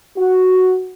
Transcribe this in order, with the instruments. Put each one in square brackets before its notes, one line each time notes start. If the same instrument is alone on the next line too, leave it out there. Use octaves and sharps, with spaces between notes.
[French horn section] F#4